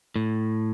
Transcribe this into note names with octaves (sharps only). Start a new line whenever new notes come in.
A2